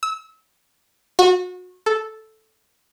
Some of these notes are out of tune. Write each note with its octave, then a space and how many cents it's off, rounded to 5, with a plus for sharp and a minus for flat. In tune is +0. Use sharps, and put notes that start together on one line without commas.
E6 -30
F#4 -30
A4 -5